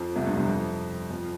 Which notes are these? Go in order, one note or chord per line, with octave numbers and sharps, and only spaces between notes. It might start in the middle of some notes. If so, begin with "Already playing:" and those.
Already playing: F2 F3
C2 C3
G2
C2 C3
F2 F3
F2 F3